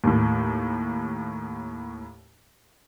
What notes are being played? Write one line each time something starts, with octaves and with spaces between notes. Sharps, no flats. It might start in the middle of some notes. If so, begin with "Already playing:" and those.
D#2 A2